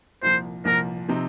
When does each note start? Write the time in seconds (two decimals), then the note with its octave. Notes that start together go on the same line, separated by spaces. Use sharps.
0.23 C2 A#2 F3 C5
0.65 C2 A#2 F3 A#4
1.09 C3 F3 C4 D#4